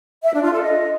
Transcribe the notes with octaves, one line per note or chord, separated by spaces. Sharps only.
E5
D4
F4
A4
D#5